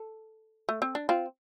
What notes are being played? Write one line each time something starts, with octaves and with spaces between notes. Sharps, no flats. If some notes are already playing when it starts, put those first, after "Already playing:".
Already playing: A4
A3
C4
D4
C4 F4